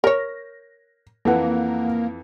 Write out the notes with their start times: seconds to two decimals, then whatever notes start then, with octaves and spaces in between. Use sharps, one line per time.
0.04 A#4 C#5 A#6
1.25 F2 E3 A#3 A4 B4 F#5